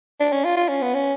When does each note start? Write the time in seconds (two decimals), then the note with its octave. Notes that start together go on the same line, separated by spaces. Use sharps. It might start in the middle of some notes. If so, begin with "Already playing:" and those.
0.20 D4
0.32 C#4
0.44 F4
0.57 F4
0.68 C#4
0.82 B3
0.94 C#4